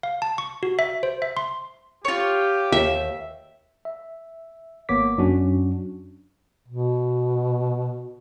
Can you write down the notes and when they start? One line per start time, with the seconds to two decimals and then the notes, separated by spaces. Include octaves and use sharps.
0.03 F5
0.22 A5
0.38 C#6
0.63 F#4
0.79 E5
1.03 C5
1.22 E5
1.37 C6
2.05 F4 G4 C#5
2.72 D#2 E5
3.85 E5
4.89 G#1 A#3 B3 C#5 D6 B6
5.18 F#2 F#3 C#4 D4 F#4
6.68 B2